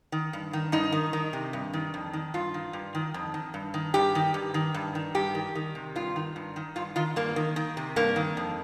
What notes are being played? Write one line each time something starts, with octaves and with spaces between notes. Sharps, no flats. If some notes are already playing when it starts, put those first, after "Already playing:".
D#3
G2
D#3
G2 D#4
D#3
D#3
C3
G2
D#3
F2
D#3
G2 F4
D#3
G2
D#3
F2
D#3
G2
D#3
G2 G4
D#3
G2
D#3
G2
D#3
G2 G4
D#3
D#3
C3
G2 F4
D#3
G2
D#3
G2 F4
D#3 F4
G2 A#3
D#3
D#3
C3
G2 A#3
D#3
F2